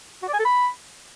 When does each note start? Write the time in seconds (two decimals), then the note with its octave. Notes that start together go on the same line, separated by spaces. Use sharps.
0.23 F#4
0.28 D5
0.34 G#5
0.39 A4
0.45 B5